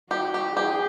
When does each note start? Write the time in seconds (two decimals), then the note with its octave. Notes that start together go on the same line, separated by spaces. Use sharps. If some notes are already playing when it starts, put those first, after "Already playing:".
0.11 F#4 G4
0.34 G4
0.56 G4 G#4